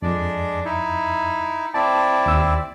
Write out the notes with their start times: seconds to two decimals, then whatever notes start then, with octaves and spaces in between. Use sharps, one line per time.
0.02 F2 G#3 D4 D5
0.65 D#4 E4
1.74 C4 E4 D5 A5
2.26 D#2 E6